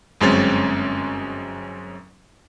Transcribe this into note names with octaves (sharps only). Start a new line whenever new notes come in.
G1 F#2 G#3 C4 C#4 A6